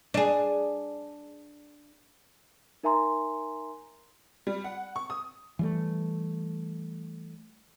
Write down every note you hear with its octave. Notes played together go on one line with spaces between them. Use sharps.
D4 G#4
D#4 A#4 E5 G#5 A#5 C6
G3
F#5
C#6
D#6
E3 G3 A3